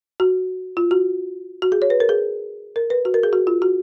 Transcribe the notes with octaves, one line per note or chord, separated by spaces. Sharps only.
F#4
F4
F#4
F#4
G#4
C#5
B4
A#4
G#4
A#4
B4
F#4
A#4
G#4
F#4
F4
F#4